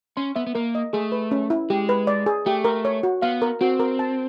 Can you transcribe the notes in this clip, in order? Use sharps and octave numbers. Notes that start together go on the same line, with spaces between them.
C#4 C6
B3 E5
B3
A#3 A#4
D#5
A3 G#4
B4
C#4
E4
G#3 G4
B4
D5
G#4
A3 G4
A#4
C#5
F#4
B3 F5
A#4
C4 F#4
A#4
A5